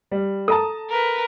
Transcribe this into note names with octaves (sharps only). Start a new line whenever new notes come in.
G3
A4 A5 A#5 D#6
A#4 B4